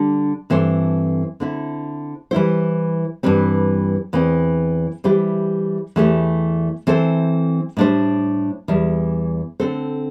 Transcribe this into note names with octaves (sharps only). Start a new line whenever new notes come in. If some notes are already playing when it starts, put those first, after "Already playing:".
Already playing: D3 G3 D4
G2 E3 C4 A4 C5
D3 C4 E4
E3 G3 E4 C5
G2 E3 G3 C4
E2 E3 C4
E3 G3 E4 G4 C5
E2 E3 A3 E4 G4
E3 C4 A4 C5
A2 G3 D4 C5
E2 E3 G3
D3 C4 A4 C5